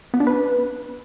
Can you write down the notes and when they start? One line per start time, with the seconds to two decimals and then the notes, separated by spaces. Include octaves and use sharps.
0.14 B3
0.20 D4
0.27 B4